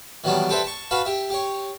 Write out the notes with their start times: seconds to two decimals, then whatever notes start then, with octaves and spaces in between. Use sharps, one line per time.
0.24 D#3 E3 F#3 G3 B3 D4
0.49 G4 A4 B4 C5 D5 E5
0.64 A5 C#6
0.91 F#4 B4 F5 A5
1.05 G4 E5
1.30 G4 C#5